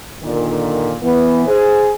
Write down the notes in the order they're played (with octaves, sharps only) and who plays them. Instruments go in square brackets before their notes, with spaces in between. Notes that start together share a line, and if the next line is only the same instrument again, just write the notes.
[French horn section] A#2 D3 D#3
E3 B3
G#4 C5